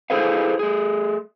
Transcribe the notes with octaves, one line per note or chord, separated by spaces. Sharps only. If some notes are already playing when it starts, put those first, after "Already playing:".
E4 G#4 A4 B4 C5 F5
A3 G#4